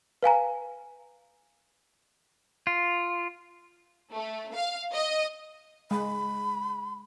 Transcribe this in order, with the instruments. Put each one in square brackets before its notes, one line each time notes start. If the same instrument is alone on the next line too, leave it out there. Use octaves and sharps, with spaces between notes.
[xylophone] B4 F5 G#5 A#5
[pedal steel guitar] F4
[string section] A3
F5
D#5
[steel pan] G#3 [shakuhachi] B5